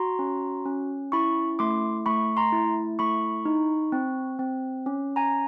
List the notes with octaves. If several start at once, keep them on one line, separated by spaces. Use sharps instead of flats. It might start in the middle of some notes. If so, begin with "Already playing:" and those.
Already playing: F#4 A#5 C6
C#4
C#4
E4 B5 C#6
A3 C6 D6
A3 B5 C#6
A#5 C6
E4
A3 B5 C#6
D#4
C4
C4
C#4
G#5 A#5